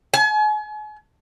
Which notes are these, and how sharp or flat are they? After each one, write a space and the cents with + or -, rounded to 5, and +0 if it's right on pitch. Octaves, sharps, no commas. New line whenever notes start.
G#5 +40